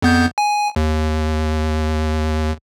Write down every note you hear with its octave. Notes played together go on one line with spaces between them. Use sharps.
F2 B3 G6
G#5
D#2